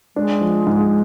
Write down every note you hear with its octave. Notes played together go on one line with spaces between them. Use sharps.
G#3 D4
F3
G#2